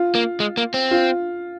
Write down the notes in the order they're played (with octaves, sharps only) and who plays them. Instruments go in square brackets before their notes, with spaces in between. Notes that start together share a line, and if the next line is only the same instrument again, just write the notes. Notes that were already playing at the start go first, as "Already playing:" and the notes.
Already playing: [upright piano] F4
[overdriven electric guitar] A#3
G#3
A#3
C4
[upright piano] F4